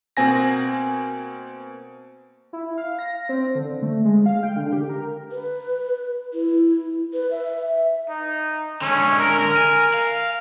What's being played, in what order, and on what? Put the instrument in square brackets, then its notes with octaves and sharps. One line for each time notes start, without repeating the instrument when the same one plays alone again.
[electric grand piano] B2 A#3 C4 G#5 A#6
[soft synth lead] E4
F5
A#6
C4
D3
A3
G#3
F5
G5
D3
G4
A#4
[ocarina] B4
E4
B4
E5
[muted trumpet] D#4
[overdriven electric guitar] D3 G#3 [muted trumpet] C#4
[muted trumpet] A#4
[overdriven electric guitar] G#5
F5